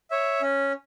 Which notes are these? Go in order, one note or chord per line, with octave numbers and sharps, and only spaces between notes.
C#5 E5
C#4